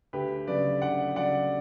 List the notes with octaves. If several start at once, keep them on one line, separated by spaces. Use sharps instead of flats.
D2 G4 B4
C#3 F#3 B4 D5
D2 D5 F#5
C#3 F#3 D5 F#5